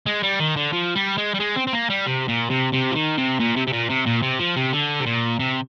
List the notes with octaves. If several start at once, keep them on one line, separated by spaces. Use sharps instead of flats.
G#3
G3
D#3
D3
F3
G3
G#3
G3
G#3
C4
C4
A#3
G3
C3
A#2
C3
C3
F3
D#3
C3
A#2
C3
C3
A#2
C3
A#2
C3
F3
C3
D3
C3
A#2
C3